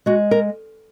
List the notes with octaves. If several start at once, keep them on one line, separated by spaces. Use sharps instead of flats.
G#3 F#4
A#4